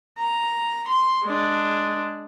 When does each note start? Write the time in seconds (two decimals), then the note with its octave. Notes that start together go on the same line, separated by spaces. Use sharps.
0.19 A#5
0.88 C6
1.25 G#3 D4